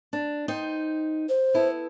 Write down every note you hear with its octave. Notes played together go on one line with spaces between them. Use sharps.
D4
D#4 C5 G5
C5
B3 E4 A4